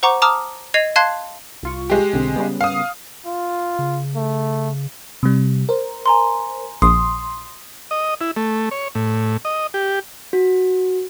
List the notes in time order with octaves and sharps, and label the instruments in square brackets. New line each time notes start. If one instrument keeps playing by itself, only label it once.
[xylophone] C5 F#5 A#5 C#6 D6
A5 A#5 D6 D#6 F6
D#5 G#6 C7 D#7 F7
F5 A5 C6 F#6 G#6 C7
[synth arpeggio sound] C2 F4 C#6
[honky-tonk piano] G#3 G4
[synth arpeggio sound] B1 D3 C4
C#3 G3 B3
[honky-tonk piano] F5 D#6
[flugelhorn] F4
[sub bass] C#3
[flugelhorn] A3
[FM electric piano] C3 G3
A#4 C5
[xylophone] G#5 A#5 C6
[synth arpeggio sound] A#1 [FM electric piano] C6 [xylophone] D#6
[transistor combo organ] D#5
E4
A3
C#5
A2
D#5
G4
[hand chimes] F#4